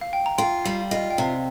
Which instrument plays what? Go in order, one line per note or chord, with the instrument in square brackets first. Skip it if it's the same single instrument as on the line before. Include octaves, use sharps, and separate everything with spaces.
[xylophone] F5
G5
A#5
[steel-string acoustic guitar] F4 [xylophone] G5 C6
[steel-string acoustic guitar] G3 [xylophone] F5
[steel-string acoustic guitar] F4 [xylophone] D#5
[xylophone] G5
[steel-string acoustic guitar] C3 [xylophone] F5